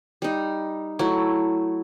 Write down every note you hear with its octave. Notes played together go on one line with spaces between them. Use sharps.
G3 D#4
F#3 A3 E4